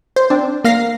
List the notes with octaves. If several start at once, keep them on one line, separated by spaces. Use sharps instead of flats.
C5
C4 D4
A#3 F5 A#6 C7